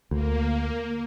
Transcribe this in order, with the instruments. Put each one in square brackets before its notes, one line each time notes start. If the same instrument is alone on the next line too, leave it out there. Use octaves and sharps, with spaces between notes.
[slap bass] D2 [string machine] A#3